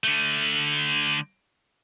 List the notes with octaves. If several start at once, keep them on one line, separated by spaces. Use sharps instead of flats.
D3 A3